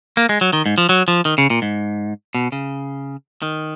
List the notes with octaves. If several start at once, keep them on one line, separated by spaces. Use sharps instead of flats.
A#3
G#3
F#3
D#3
G#2
F3
F#3
F3
D#3
C#3
A#2
G#2
B2
C#3
D#3